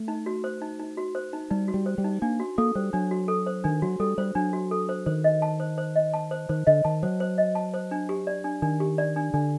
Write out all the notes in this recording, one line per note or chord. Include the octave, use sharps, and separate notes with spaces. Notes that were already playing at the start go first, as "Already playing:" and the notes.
Already playing: A3
D#4
F#4
C5
D#4
D#4
F#4
C5
D#4
G3 D#4
F#4
G3
C5
G3
D#4
A#3 D4
F#4
A#3 A4
G3 C5
F#3 D4
F#4
A4
C5
D#3 D4
F#3 F#4
G3 A4
G3 C5
F#3 D4
F#4
A4
C5
D#3 C5
D#5
A5
C5
C5
D#5
A5
C5
D#3 C5
D3 D#5
D#3 A5
F#3 C5
C5
D#5
A5
C5
D4
G4
D5
D4
D#3 D4
G4
D5
D4
D3 D4